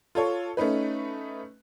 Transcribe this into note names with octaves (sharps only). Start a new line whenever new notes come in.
F4 A4 C#5
A3 C#4 D#4 B4